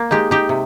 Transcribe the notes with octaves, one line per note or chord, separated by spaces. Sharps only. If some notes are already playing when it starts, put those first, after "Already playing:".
Already playing: A#3
G#3 D#4 G4
D#4 G4
C3